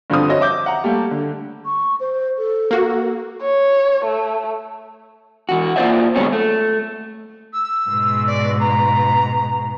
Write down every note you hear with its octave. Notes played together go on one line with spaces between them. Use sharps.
G2 D3 F3 C4 F4 D#6
F#4 C#5 D#5
E5 D6 G6
F#5 A#5
G3 A3 A#3
D3
C#6
C5
A4
A#3 F#4
C#5
A3
E2 F#4
A#3 F4 F#4 C5 D5 E5
D3 F#3 G#3 B3 C#5
A3
E6
G#2 B2
D5
A#5